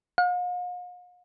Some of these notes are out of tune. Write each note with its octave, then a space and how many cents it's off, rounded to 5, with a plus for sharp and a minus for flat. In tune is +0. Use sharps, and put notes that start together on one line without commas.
F5 +45